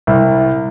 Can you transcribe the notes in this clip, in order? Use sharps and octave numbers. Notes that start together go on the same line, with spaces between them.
C2